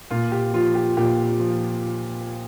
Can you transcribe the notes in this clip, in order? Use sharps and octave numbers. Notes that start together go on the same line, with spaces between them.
A#2 F4
G4
F3 F4
G4
A#2 G4
F3